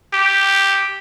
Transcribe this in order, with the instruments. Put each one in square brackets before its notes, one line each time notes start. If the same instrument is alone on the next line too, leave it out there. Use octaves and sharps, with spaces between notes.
[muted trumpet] G4